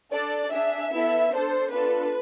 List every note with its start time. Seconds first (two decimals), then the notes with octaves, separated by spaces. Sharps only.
0.12 D4 A4 D5
0.52 D4 G#4 E5
0.92 B3 E4 A4
1.31 D4 C5
1.36 A4
1.71 B3 D4 F4 A4 B4